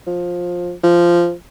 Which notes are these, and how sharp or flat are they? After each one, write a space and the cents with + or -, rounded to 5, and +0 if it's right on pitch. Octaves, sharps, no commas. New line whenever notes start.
F3 +15
F3 -10